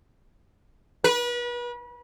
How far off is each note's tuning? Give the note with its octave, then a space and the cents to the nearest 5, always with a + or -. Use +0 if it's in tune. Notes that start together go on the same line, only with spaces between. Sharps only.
B4 -35